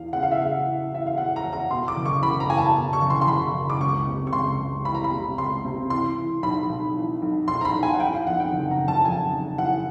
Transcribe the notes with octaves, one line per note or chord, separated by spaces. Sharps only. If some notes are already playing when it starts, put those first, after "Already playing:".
Already playing: E2 E3 F5
C#3 F#5
F5
E5
C#3 F5
E3
E3 E5
F5
E3 F#5
A#5
E2
A#5
B2 C6
D6
F#1
C#6
F#1 B5
A#5
E2 G#5
A5
B2
C#6
F#1
C6
C6
F#1 B5
F#1
D6
C#2 C#6
C3
C#6
C#2 C6
C#2
E3 B5
A#5
B5
C3
C#2 C6
C3
E3 C6
E3
B1 B5
B1
E3
B1
B1 C6
A#5
B5
B1
G#5
F#5
E3 G5
F5
F2 F#5
G5
F#1
A#5
F#1
A5
F2 G#5
F#1
E3 F#5